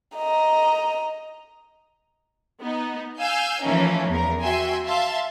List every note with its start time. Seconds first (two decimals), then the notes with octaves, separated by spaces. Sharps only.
0.16 D#5 A#5
2.61 B3 D#4
3.19 F5 G#5 E6 G6
3.62 E3 F3 A3 A#3 C#4 D#4
4.09 E2 A#4
4.42 F#4 E5 G5 G#5 C6
4.86 E5 F5 A5 C6